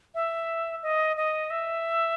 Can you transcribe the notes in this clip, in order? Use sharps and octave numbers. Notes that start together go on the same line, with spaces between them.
E5
D#5
D#5
E5